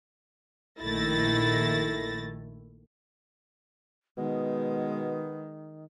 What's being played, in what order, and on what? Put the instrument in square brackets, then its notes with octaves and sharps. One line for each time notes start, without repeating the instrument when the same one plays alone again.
[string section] A#1 D#3 A3 E4 A6 A#6
[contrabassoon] B2 [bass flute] D#3 [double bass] G#3 [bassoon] B3